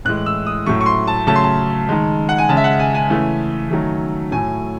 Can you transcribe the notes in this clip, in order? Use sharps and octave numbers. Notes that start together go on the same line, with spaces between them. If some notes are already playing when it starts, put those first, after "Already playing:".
A2 E3 G#3 F#6
E6
D#6
A2 F#3 A3 C#6
C#6
C6
A5
C#3 F#3 A3 A5
C6
A5
D#3 G#3
F#5
G#5
C#3 G#3 A5
E5
F#5
G#5
G#5
C#3 E3 A3
D#3 F#3 A3
A2 F#3 A3 G#5